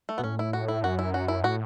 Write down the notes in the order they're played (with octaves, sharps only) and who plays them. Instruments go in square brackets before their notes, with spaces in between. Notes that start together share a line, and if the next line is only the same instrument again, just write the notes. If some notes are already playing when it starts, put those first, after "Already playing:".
[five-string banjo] A3
[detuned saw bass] B2 [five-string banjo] B3
[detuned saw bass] A2 [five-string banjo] C#4
[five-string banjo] E4
F#4
E4
[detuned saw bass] F#2 [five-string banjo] F#4
[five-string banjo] E4
F#4
E4
[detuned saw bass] A2 [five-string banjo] F#4